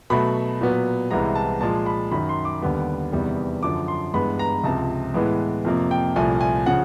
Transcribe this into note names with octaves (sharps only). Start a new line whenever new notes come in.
B2 F#3 A3 B5
A#2 F#3 B3
C2 C3 E3 G#3 B3 A#5
A5
A#2 F3 G#3 A5
B5
F#2 D#3 F#3 B5
C6
D6
D#2 D3 G3 B3
E2 C3 D#3 G3 B3
F#2 D3 F3 D6
C6
G2 E3 G#3 B3 B5
A#5
C#2 C3 F3 A5
A2 E3 G#3 B3
F2 C3 F3 A#3
G5
C2 A#2 F3 A3 G#5
G#5
C#3 F3 F#5